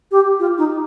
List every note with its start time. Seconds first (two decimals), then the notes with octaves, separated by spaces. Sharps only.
0.12 G4
0.40 F4
0.58 D#4